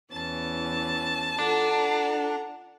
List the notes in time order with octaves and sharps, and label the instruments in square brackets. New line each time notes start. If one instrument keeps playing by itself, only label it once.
[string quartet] E2 E3 C#4 [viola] A5
[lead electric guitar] D4 [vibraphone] F4 A4 [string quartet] F#5 A#5